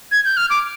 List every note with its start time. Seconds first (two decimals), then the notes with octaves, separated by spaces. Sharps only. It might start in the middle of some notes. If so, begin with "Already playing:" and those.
0.11 G#6
0.25 G6
0.37 F6
0.50 D6